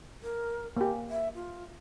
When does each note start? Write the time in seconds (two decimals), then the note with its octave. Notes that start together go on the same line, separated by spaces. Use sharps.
0.22 A#4
0.77 A#3 G4 G#5
1.10 E5
1.35 F4